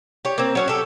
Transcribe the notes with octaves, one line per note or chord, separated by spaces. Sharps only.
G4 C#5
A#3 C4
F#3 C#4 C#5
G4 A4